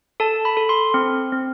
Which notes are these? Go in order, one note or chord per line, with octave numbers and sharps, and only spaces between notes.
A4 A5
B5
A4
C6
C4
C4